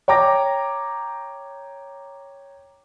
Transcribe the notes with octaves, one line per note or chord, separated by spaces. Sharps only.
C#5 G5 A#5 D6 A#6